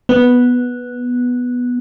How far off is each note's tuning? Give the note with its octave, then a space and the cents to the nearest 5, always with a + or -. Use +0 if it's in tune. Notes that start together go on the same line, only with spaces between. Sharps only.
B3 -5